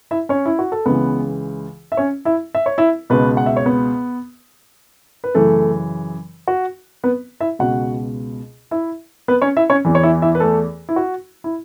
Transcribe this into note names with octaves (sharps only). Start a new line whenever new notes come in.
E4 E5
C#4 C#5
E4
F#4
A4
C#2 C#3 E3 B3 B4
E5
C#4 C#5
E4 E5
E5
C#5
E4 E5
C#2 B2 B3 B4
F#5
E5
C#5
B3 B4
B4
F#2 C#3 E3 A3 A4
F#4
B3 B4
E4 E5
C#2 B2 F#4 F#5
E4 E5
B3 B4
C#4 C#5
E4 E5
C#4 C#5
E2 E3
C#5
E4 E5
E4 E5
B4
A3 A4
E4
F#4
E4